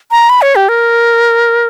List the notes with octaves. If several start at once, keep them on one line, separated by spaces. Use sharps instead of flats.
A#5
B5
C#5
G4
A#4